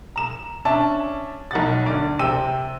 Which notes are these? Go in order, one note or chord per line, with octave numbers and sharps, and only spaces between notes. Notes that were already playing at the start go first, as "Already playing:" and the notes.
A#5 E7
C#4 D4 E5 A5
B1 F#5 A6
D2 D5
C3 C4 G5 E6 D#7